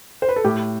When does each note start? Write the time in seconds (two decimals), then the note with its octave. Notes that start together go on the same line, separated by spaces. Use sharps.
0.22 C5
0.29 B4
0.36 A4
0.44 A2 G4